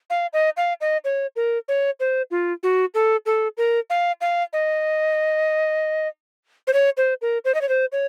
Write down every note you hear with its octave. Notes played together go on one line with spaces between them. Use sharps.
F5
D#5
F5
D#5
C#5
A#4
C#5
C5
F4
F#4
A4
A4
A#4
F5
F5
D#5
C5
C#5
C5
A#4
C5
D#5
C#5
C5
C#5